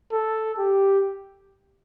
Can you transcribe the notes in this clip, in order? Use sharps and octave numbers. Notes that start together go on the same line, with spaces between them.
A4
G4